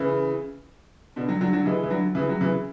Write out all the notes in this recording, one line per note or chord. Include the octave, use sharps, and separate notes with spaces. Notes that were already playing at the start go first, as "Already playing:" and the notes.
Already playing: C#3 E3
B2 D3
D3 F#3
D3 F#3
D3 F#3
E3 G#3
E3
D3 F#3
C#3 E3
F#3
C#3 E3